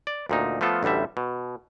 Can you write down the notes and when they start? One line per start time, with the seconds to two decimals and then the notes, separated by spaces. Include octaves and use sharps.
0.07 D5
0.29 D2 A#2 D#4
0.61 F3 A3 B3 F4 A4
0.83 A1 D2 D3 G3 E5
1.17 B2